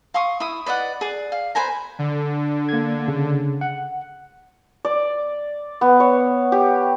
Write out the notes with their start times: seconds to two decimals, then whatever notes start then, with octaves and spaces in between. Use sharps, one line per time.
0.14 F5 C6 C#6 D#6
0.40 E4 D#6
0.66 B4 D5 D#5 F#5
1.01 G#4 D5
1.32 F5
1.55 B4 C5 G#5 A#5
1.99 D3
2.69 A#3 G#6
3.08 C#3
3.61 F#5
4.85 D5
5.81 B3
6.00 C#5
6.52 G4